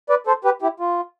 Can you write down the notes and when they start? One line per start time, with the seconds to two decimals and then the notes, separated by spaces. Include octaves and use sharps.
0.09 B4 D5
0.27 A4 C5
0.45 G4 B4
0.62 E4 G4
0.80 F4